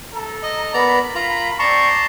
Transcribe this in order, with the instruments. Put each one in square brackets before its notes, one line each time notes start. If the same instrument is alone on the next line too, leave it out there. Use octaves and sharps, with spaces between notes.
[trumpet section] A4 A#5
[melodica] D#5
[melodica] B3 D5 A#5 [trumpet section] A#4 B5
[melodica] F4 A#5
[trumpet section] C4 D5 C#6 [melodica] A5 A#5 C6